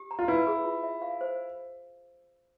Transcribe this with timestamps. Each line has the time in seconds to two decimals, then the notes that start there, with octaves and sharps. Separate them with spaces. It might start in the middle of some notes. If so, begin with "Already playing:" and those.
Already playing: G4
0.11 A#5
0.19 F4
0.28 E4 B4
0.47 G#4
0.65 F4
0.83 E5
1.02 F5
1.21 C5